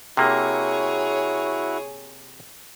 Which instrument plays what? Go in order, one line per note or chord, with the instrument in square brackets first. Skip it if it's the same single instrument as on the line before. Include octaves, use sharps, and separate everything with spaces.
[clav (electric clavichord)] C3 A#3 [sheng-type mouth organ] E4 F#4 [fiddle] G#4 C#5